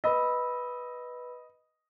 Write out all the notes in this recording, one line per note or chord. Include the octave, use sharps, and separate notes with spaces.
B4 D#5 B5 E6